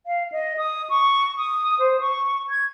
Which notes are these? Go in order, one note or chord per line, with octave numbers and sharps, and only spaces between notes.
F5
D#5
D#6
C#6
D#6
C5
C#6
G#6